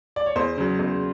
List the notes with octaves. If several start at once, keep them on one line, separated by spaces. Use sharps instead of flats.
D5
C#5
E2 C5
C#3 F#3
E2